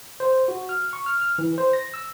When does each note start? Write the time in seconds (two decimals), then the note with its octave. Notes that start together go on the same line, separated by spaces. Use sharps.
0.20 C5
0.48 F#4
0.69 F6
0.93 C#6
1.06 F6
1.21 F6
1.38 E3
1.58 C5
1.73 A#6
1.94 E6